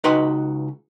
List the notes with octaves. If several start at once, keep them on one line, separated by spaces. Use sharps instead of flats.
C#2 D#4 F#4 B4 G5 C6